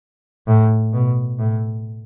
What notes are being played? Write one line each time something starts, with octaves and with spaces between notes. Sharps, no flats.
A2
B2
A2